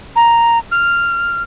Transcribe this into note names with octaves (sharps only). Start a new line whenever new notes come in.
A#5
F6